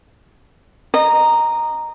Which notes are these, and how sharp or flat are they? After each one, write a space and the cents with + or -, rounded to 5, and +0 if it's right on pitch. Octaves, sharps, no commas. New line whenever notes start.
D#5 -25 A#5 +0